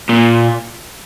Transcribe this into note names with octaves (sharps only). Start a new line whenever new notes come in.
A#2